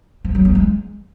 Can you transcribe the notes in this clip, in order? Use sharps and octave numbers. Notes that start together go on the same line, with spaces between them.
F3
F#3
B3
G#3